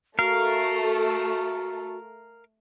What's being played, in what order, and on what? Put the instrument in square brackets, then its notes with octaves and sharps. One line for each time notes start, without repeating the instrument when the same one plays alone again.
[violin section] A3 A4 [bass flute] F#4 [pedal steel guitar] A#4 F5